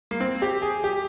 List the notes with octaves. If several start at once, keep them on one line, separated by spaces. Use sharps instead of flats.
A#3
C4
G4
G#4
G4